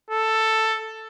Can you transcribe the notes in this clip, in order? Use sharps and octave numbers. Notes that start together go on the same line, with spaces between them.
A4